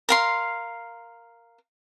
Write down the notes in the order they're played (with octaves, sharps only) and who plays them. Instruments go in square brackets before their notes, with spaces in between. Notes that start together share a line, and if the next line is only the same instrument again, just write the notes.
[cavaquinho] A#4 F5 C6